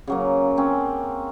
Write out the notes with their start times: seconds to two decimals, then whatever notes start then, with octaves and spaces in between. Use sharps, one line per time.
0.07 C#3 F#3 A#3
0.57 C4 C#4